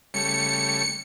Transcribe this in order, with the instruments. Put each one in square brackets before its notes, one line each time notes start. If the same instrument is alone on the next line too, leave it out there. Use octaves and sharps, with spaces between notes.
[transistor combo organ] C#3 G3 A3 [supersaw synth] C#7